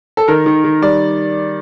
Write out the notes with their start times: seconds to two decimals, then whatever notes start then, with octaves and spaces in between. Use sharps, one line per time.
0.17 A4
0.28 D#3 A#4
0.46 D#3
0.64 D#3
0.82 G3 D5